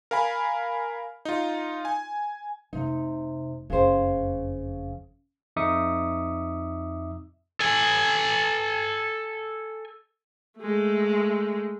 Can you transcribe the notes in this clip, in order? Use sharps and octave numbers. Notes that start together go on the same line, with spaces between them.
A#4 F5 G#5 B5
D#4 F4
G#5
F1 C3 D#4
F#1 F2 C#3 C5
F2 D#4 E5 D6 D#6 C#7
A4 G#5
G#3 A3